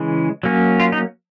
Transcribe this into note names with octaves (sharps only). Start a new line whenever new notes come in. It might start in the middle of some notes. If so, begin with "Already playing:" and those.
Already playing: C#3 E3 G#3
F#3 A#3 C#4
F4
D#4